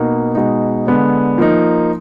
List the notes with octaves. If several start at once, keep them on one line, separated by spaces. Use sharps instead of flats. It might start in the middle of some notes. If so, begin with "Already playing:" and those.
Already playing: B2 A#3 D#4
B2 G#3 D#4
D3 G#3 B3 D4
F3 A#3 D#4